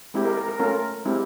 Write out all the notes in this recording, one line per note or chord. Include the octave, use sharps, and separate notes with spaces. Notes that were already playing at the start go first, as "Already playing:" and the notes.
G#3 C4 E4 G4
A#4
A#4
A#4
A3 C#4 F4 A#4
G#3 C4 E4 G4